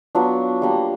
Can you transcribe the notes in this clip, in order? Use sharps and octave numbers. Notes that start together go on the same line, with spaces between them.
F#3 B3 D4 F4
G3 A#3 D4